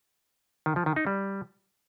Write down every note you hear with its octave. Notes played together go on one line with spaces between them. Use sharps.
D#3
F3
D#3
D#4
G3